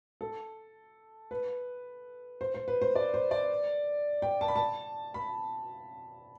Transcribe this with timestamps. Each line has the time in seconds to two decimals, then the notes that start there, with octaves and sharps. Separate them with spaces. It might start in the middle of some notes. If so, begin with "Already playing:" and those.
0.21 A4
1.31 B4
2.41 C5
2.54 C5
2.68 B4
2.82 C5
2.95 D5
3.14 C5
3.31 D5
4.22 G5
4.41 A5
4.48 B5
4.56 A5
5.14 B5